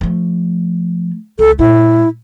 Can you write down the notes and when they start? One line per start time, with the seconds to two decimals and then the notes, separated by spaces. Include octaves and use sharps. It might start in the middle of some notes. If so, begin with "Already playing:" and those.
0.01 F3 A3
1.39 C#2 A4
1.59 A#2 G#3 E4